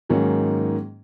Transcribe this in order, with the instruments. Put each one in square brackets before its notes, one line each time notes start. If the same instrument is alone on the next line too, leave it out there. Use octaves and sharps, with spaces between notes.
[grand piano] G#2 D#3 F#3 A#3 C#4